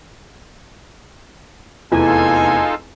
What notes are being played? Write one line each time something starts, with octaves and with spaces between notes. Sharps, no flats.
F1 E2 D#4 F4 A4 G#5